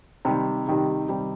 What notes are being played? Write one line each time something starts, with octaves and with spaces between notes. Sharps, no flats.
C3 D#3 G3
C3 D#3 G3
C3 D#3 G3